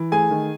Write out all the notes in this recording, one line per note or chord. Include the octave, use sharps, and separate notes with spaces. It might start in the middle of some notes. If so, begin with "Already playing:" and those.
Already playing: E3
A3 G#4 G#5
D#3